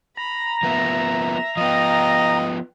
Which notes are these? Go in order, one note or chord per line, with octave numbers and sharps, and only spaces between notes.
A#5 B5
F3 A#3 B3 E5
F3 B3 D#5 F5 G5